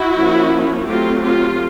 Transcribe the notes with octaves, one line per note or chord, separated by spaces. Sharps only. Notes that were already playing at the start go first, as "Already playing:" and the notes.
Already playing: E4 F#4
F3 A#3 C#4
F#3 A3 C4 F4 G4
F4 G4